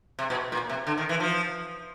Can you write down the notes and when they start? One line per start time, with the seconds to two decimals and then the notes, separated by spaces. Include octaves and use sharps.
0.19 C3
0.30 B2
0.52 A#2
0.69 C3
0.87 D3
0.98 D#3
1.09 E3
1.20 F3